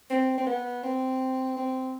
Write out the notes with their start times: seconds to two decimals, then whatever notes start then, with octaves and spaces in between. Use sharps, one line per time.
0.10 C4
0.38 C4
0.46 B3
0.83 C4
1.56 C4